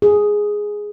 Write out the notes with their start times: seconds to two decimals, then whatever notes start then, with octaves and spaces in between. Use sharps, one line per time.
0.02 G#4